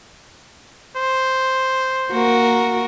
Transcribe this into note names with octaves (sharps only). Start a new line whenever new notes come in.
C5
A#3 F#4 A#4